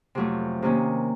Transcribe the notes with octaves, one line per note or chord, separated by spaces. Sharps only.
F2 C3 F#3 A3
C3 D#3 A#3 C#4